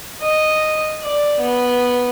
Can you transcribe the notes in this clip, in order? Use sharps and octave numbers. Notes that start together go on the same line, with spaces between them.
D#5
D5
B3